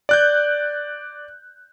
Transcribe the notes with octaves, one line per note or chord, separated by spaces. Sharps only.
D5 F#6 G6